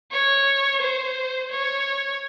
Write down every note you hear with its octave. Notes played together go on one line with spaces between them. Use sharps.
C#5
C5
C#5